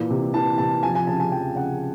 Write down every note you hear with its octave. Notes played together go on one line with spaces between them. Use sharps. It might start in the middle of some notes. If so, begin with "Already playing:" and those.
Already playing: A#2 E3
C3
E3 A5
C3 A5
F3 G#5
G#5
C#3 A5
G#5
F3 G5
C#3 F#5